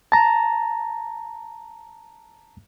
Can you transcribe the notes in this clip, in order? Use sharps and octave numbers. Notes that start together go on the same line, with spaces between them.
A5 A#5